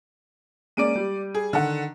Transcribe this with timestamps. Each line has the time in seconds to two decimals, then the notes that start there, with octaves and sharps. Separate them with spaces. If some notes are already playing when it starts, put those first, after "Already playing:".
0.77 G#3 A#3 C#4 D5 D7 D#7
0.95 G3
1.35 G#4
1.53 D3 D#3 F#5